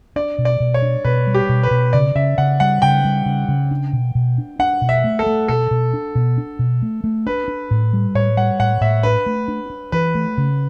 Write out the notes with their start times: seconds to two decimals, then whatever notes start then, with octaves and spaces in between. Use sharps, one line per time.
0.16 D4 D5
0.38 B2
0.45 D5
0.60 B2
0.74 C#5
0.82 D4
1.05 B2 B4
1.27 G3
1.34 G4
1.49 B2
1.63 B4
1.71 B2
1.93 C#3 D5
2.15 C#3 E5
2.38 C#3 F#5
2.60 G3 F#5
2.82 C#3 G5
3.05 G3
3.26 C#3
3.48 C#3
3.71 D4
3.93 B2
4.15 B2
4.38 D4
4.59 D4 F#5
4.81 B2
4.89 E5
5.04 A3
5.19 A4
5.26 A3
5.48 B2 A4
5.71 B2
5.94 D4
6.15 B2
6.38 D4
6.59 B2
6.82 A3
7.04 A3
7.26 D4 B4
7.48 D4
7.71 A2
7.93 G3
8.15 A2 C#5
8.37 G3 F#5
8.60 A2 F#5
8.81 A2 E5
9.03 D4 B4
9.26 A3
9.48 D4
9.70 D4
9.92 E3 B4
10.15 A3
10.38 C#3